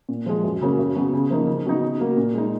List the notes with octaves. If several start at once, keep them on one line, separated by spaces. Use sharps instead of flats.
A#2
F3 G#3
F#2
C#3 F#3 A#3 C#4
F#2
C#3 F#3 B3
C#3
F3 A#3 D#4
C#3
F#3 B3 D#4
C#3
F#3 A#3
A#2
G#3 D#4